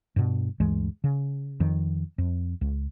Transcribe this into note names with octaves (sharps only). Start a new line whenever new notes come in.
G2 B2
D2 G2 E3 G#3
C#3
F2 D#3
F2
C#2